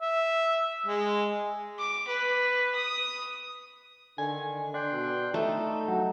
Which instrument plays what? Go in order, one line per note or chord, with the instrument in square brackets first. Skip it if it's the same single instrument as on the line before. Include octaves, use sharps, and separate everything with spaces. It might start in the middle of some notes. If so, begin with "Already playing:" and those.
[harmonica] E5
G#3
[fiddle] D6
B4
D#6
[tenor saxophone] D3 [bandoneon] D#3 [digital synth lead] G#5
[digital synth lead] D4 [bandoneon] G5 C6 F#6
[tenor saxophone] B2
[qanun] A3 [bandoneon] D#4 [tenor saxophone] A4
[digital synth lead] F#3